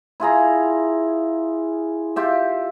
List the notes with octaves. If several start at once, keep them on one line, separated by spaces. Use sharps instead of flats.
E4 F4 G#4 A#5
F4 G4 E5